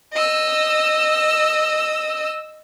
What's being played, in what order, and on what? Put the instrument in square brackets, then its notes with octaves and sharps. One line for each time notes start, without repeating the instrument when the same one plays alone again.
[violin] D#5 E6